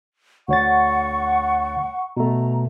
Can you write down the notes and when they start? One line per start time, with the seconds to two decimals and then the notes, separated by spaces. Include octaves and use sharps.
0.48 D2 C#5 F#5 C#6 A6
2.17 B2 A3 A#5